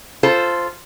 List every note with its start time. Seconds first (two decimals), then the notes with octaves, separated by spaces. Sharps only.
0.23 F4 A4 C5